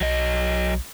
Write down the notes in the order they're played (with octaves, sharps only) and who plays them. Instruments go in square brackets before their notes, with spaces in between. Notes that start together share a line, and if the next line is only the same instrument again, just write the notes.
[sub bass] B1 [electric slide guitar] F#3 D#5